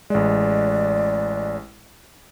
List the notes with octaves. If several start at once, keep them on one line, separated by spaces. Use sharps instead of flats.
A1 G#3 D5